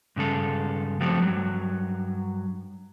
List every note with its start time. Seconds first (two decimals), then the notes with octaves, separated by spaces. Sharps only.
0.16 G2 C#3 G#3 A4
1.00 F3 F#3 A3 C4 G4 A4
1.21 G2 F#3